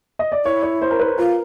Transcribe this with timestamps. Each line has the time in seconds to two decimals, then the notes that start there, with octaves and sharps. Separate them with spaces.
0.19 D#5
0.32 D5
0.45 E4 C#5
0.63 C#5
0.82 C5
0.91 A#4
1.00 B4
1.17 F4 A#4